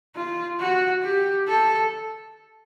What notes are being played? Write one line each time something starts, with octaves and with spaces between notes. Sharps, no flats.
F4
F#4
G4
A4